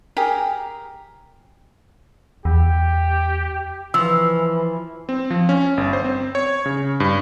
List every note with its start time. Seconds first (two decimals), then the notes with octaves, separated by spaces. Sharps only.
0.17 G4 G#4 A#4
2.45 E2 G4
3.94 E3 F3 E6
5.09 C4
5.31 F3
5.49 C#4
5.77 G1
5.93 C5
6.05 C4
6.35 C#5
6.66 C#3
7.00 G2